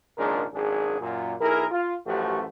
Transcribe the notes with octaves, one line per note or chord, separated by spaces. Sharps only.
G#1 A#2 C#3 G#3 D4 A#4
G#1 F#2 D4 G#4
F#2 A#2
B1 E4 G#4 A#4
F4
A1 F#2 F3 A3 F#4 G4